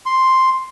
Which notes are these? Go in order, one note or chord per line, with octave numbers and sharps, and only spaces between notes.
C6